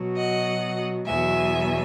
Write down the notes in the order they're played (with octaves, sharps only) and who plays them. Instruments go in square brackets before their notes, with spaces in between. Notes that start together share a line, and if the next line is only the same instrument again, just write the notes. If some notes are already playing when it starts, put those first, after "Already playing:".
Already playing: [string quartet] B2 F#3
D#5 F#5
E2 B2 F#3 E5 G#5